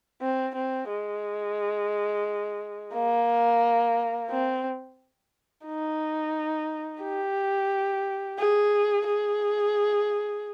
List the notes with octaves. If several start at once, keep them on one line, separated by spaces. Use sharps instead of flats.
C4
C4
G#3
A#3
C4
D#4
G4
G#4
G#4